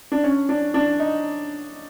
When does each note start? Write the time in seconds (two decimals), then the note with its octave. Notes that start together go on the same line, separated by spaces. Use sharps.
0.12 D4
0.24 C#4
0.49 D4
0.74 D4
1.00 D#4